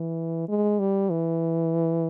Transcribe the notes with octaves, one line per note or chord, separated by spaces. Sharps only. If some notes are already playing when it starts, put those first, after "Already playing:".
Already playing: E3
G#3
G3
E3